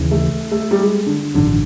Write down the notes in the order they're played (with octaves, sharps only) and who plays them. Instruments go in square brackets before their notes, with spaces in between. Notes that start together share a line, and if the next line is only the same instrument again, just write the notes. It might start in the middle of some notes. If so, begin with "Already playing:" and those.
Already playing: [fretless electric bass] D#2 C#3 E3
[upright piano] A3
A3
G3
G#3
D3
[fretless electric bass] A1 G2 D#3 F#3 [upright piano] D3